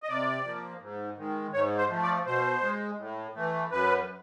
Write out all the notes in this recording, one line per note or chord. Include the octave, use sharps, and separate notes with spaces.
D#5
C3 D5
F3 A#3
G#2
D#3 G#3
G#2 C#5
C5
F3 A3
D5
B2 C5
G#3
A2
E3 A3
F#2 B4